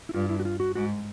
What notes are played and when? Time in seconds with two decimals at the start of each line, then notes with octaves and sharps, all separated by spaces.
0.09 E4
0.14 G2 F4
0.30 E4
0.40 F#4
0.45 F4
0.60 F#4
0.75 G#2 F#4